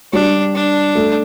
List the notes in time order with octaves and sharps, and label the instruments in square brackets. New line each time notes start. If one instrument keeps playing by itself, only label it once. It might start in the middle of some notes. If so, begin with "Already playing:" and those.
[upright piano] G3 [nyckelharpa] D4
[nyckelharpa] D4
[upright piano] A3